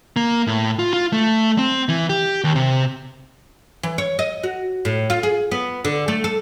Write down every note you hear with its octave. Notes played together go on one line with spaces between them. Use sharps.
A#3
A2
F4
F4
A3
C4
E3
G4
D#2
C3
E3
C#5
D#5
F#4
A2
F4
G#4
B3
D3
A3
A4